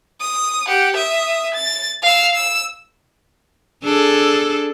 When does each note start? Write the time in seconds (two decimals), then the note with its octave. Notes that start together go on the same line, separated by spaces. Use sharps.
0.20 D#6
0.68 G4 F#5
0.97 E5 D#6
1.54 A6
2.03 F5 E6
2.34 E6
3.83 D4 G#4 A4